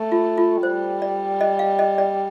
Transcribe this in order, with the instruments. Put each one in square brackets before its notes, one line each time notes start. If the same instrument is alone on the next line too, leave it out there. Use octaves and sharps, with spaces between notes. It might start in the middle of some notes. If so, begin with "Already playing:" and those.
Already playing: [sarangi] A3
[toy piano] F4
F4
[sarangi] G3 [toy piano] C5
[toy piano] D5
D#5
F5
D#5
D5